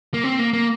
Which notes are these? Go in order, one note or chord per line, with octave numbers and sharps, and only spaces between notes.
A#3
C4
A#3
A#3